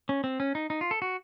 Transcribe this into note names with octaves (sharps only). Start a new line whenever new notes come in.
C#4
C4
C#4
D#4
D#4
F4
A4
F#4